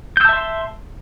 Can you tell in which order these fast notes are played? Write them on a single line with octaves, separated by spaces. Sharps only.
G6 E6 A5 E5 C6